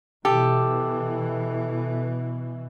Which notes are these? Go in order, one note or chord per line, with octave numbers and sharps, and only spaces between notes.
B2 E3 G4 A4